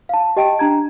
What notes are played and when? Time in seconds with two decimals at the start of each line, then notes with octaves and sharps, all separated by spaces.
0.09 F5 A5
0.37 G4 D#5 G5 A5 D7
0.59 D4 A#5 G#6